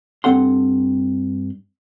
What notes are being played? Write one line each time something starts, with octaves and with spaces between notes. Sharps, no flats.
G2 A#3 C4 A4 F#5 C6